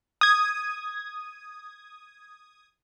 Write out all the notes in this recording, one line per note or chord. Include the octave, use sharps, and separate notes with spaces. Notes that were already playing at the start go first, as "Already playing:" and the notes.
D#6 G#6